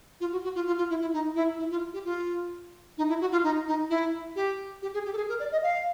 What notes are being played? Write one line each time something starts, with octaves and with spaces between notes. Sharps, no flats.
F4
F#4
F#4
F4
F4
F4
E4
E4
D#4
E4
E4
F4
G4
F4
D#4
E4
F#4
F4
D#4
D#4
E4
G4
G4
G#4
G4
A4
G#4
A#4
D5
D#5
F5